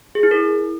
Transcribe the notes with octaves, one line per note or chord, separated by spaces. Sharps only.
G#4
E4
A#4